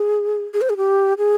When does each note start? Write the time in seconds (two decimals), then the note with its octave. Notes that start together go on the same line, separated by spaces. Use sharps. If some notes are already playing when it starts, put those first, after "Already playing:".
Already playing: G#4
0.54 G#4
0.61 C5
0.70 G#4
0.77 G4
1.18 G#4